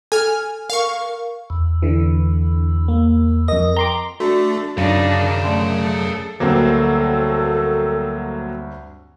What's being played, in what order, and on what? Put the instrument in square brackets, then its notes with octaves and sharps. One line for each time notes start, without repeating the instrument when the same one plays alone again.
[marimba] A4 [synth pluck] G#5 F6
[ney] A#4 [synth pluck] F5 C#6
[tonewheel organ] E2
[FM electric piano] D3 E3
A#3
[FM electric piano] F2 D#5 [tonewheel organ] A#4
[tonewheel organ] G5 [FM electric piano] A#5 C6 D6
[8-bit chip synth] A3 [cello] D4 [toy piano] F#4
[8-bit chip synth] F#2 [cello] D4 D#4 [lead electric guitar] G#4 F5
[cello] A3 [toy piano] D5 A5 C6
[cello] A4
[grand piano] D2 G2 [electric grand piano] F#3 A#3 C4 [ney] A4